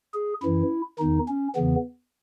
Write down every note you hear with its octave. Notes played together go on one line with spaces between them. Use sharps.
G#4
F#2 E3 E4
E2 D#3 D#4
C#4
E2 C#3 E3 B3